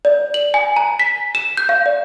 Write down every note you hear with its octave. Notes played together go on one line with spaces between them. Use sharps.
D5
F#7
G#5
A#5
B6
E7
G6
F5
D5